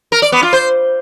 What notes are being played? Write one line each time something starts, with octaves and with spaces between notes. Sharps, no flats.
A#4
D5
B3
F4
C5